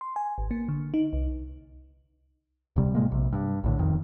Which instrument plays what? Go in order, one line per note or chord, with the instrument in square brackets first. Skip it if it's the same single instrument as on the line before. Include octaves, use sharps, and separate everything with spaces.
[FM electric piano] C6
G#5
G#1
A#3
D3
D#4
C2
[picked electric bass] D1 C3 G3
A2 C3 G#3 A#3
A#1 C3
G2
A#1 A2 D3
E1 F2 D#3